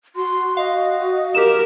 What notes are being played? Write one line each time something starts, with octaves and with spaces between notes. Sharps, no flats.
F#4 C6
D#5 F5
G4 A#4 E7